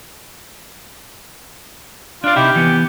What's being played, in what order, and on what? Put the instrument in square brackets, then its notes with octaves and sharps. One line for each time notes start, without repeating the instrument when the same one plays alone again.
[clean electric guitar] D4 D5 [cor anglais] F4
[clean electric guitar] C3 D#4 E4 [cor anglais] G4
[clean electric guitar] E3 B3